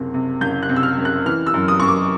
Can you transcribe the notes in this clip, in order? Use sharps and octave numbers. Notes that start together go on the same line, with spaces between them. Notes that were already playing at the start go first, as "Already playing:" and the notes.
Already playing: F#1 C3
C3
F#1 G6
F#6
C3
E6
F6
F#1
F#6
E3 F6
E6
F#2
D#6
F#2 C#6
D6